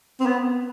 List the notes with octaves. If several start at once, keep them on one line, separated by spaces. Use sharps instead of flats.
C4
B3